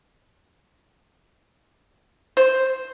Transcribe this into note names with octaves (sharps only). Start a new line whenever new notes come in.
C5